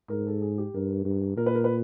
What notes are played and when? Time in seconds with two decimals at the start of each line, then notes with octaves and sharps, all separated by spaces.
0.10 G#2 A#4
0.27 A4
0.42 G#4
0.58 G4
0.74 G2 A#4
1.05 G2
1.37 A#2 A#4
1.46 B4
1.55 A#4
1.64 B4